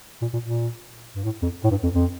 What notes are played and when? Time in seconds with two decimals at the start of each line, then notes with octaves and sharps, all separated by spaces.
0.21 A#2
0.33 A#2
0.44 A#2
1.15 G2
1.24 A2
1.42 F2
1.64 A2
1.70 G2
1.83 F2
1.95 F2